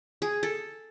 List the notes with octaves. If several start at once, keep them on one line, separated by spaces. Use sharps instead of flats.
G#4
A4